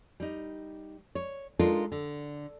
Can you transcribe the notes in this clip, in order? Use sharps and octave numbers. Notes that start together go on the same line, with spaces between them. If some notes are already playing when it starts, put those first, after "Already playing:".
G3 D#4
C#5
G#3 D4 D#4 F4 A4 A#4
D3